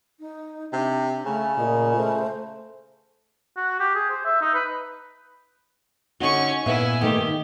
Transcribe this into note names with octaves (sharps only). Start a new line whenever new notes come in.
D#4
C3 D4
C#3 A3
A#2 D#5
A3 C5
F#4
G4
G#4
C5
E5
D#4
B4
D3 C#4 D#4 F#4 C#6
A#2 B3 E4 E5 G#5
D#3 A3 A#3 G4